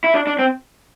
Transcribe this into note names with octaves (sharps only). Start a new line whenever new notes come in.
E4
D4
D4
C4